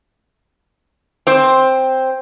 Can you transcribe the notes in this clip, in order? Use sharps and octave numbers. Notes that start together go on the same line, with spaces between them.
C4 C5